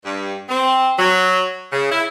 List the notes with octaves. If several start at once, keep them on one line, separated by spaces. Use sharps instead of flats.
G2
C4
F#3
C#3
E4